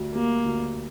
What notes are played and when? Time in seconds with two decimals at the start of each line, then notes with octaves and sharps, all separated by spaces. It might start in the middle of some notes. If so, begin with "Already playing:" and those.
Already playing: D2 G3
0.15 G3 A#3
0.45 D2